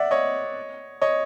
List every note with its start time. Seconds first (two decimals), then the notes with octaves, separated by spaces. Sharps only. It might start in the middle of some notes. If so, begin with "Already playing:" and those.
Already playing: D5 E5 F#5
0.11 C#5 D#5
1.01 C#5 D#5